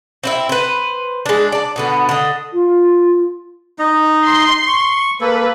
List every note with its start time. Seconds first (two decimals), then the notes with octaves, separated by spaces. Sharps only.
0.23 C4 E4 E5
0.49 B4 C5
1.26 G#3 D4
1.52 D5 A5
1.76 B2 D3 B3
2.09 D3 D#5
2.53 F4
3.79 D#4 D#5
4.24 C6
4.67 C#6
5.21 A#3 A4 B4